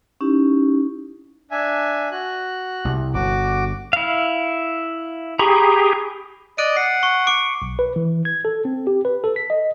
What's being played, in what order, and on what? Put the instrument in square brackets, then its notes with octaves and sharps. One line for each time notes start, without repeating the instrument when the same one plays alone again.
[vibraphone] C#4 D#4 E4 G4
[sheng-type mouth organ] D4 E5 G#5
F#4 F#6
[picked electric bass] C2
[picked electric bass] G1 [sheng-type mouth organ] F#4 D6
[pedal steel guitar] E4 F5
[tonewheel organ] G4 G#4 [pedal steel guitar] A#5 B5 C#6
[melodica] D5 D#5 [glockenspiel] F#6 D7 D#7
[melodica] F#5 [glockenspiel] C7
[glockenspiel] C#6
D6 C#7 D7
[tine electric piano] B1
B4
E3
G#6
A4
C4
G4
B4
A4
B6
D#5